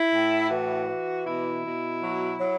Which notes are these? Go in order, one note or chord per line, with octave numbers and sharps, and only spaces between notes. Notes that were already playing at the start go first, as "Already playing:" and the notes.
Already playing: E4
A2
E3 F#4
E3
B2 E4
B2
F#3
F#3